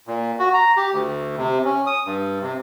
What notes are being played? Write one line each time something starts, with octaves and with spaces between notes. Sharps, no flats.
A#2
F#4
A#5
G4
D2
C3
C#4
D#6
G2
C3